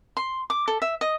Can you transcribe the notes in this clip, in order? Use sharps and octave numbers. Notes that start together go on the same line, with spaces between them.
C6
D6
A4
E5
D#5